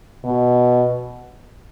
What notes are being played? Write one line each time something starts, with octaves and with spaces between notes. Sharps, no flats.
B2